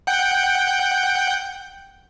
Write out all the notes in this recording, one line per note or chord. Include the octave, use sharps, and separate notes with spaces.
F#5 G5 G6